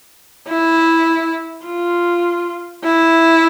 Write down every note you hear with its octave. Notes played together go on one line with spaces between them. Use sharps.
E4
F4
E4